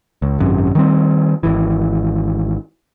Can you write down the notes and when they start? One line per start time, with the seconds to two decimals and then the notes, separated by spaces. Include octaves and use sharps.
0.22 C#2
0.39 G#1 F#2 C3
0.75 D#3 G3 C4
1.43 G#1 E3